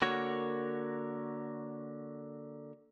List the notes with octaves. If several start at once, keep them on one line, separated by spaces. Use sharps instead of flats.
D3 A#3 F#4 A#4 C#5